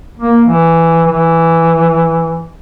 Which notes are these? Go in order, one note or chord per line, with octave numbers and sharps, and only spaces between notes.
A#3
E3
E3